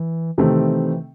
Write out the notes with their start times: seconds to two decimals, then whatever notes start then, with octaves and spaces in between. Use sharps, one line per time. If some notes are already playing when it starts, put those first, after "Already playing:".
Already playing: E3
0.38 C3 D#3 E3 A3 C4